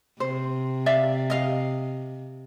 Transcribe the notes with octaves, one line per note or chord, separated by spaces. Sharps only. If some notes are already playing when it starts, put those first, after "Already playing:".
C3 C5
D5 E5 F5
D#5 F5